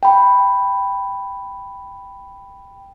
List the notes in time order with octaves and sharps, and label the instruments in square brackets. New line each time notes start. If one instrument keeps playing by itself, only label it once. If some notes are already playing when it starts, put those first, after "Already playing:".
[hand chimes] G5 B5